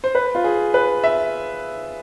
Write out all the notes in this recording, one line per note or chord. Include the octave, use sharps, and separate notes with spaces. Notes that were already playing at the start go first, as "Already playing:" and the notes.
C5
B4
F4
G#4
B4
E5